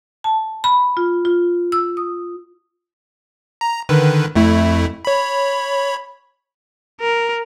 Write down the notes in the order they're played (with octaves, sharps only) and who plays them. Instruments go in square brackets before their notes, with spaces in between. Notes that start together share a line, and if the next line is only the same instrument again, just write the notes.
[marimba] A5
B5
F4
F4
E6
D#6
[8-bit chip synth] A#5
D3 D#3 B4
F2 A3 E4
C#5 B5
[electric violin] A#4